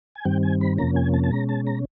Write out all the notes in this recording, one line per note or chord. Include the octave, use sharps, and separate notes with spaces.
G#5
G2 D#3 G3 C4 G5
G#5
B5
F2 C3 F3 A#3 C#4 A#5
G#5
A5
A5
B2 G#3 C#4 A#5
A5
A#5